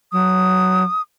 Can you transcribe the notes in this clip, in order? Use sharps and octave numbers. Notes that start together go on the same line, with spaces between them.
F#3 D#6